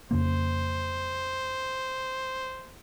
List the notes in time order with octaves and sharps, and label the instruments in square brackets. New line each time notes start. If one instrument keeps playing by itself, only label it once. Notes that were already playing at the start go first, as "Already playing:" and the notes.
[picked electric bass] F2 C#3 A#3 [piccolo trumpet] C5